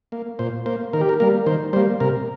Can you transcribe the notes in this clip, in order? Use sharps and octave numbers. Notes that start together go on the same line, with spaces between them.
A#3
A#2 C5
A#3 C5
D#3 A#4
G4
A#4
G3 A#3 A#4
D#3 C5
G3 A#3 C5
C3 A#4